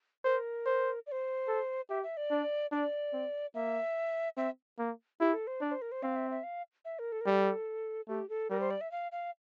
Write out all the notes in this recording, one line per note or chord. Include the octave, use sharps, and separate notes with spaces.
A#4 C5
C5
D5
C5
A4
G4 E5
E5
D5
D4
D4 D5
C4
A#3 E5
C4 E5
A#3
E4 G4
A4
C5
D4 D5
C5
A#4
C5
C4 F5
E5
E5
F5
E5
A#4
A4
A#4
G3 A4
A3 G4
A4
G3 A#4
C5
D5
E5
F5
F5